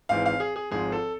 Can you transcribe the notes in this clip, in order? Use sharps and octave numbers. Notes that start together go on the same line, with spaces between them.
G#1 G#2 E3 F5
F5
G#4
G#4
G#1 G#2 F3 G#4
A4